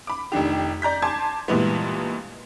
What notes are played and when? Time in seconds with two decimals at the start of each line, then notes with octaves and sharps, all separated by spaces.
0.07 B5 D6
0.32 F1 D#3 D4 G4
0.82 D5 A#5 G6 B6
1.02 G#5 A5 C6 D6 G#6
1.48 G2 A#2 E3 G#3 B3